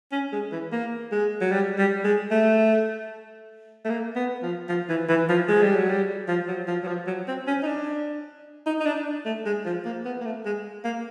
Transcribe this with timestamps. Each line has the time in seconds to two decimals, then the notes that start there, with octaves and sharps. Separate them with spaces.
0.12 C#4
0.32 G#3
0.52 E3
0.72 A#3
1.12 G#3
1.41 F#3
1.52 G3
1.78 G3
2.04 G#3
2.31 A3
3.85 A3
3.90 A#3
4.16 B3
4.42 F3
4.69 F3
4.89 E3
5.09 E3
5.29 F3
5.48 G#3
5.62 G3
5.76 F#3
5.89 G3
6.28 F3
6.48 F#3
6.67 F3
6.83 F#3
6.87 F3
7.07 F#3
7.28 C4
7.47 C#4
7.63 D#4
7.67 D4
8.66 D#4
8.80 D#4
8.86 D4
9.25 A3
9.45 G#3
9.65 F3
9.85 A#3
10.05 B3
10.20 A#3
10.25 A3
10.45 G#3
10.85 A#3